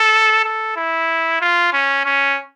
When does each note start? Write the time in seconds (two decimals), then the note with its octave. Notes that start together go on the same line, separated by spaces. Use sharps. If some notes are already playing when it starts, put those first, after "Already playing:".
Already playing: A4
0.45 A4
0.77 E4
1.41 F4
1.73 C#4
2.05 C#4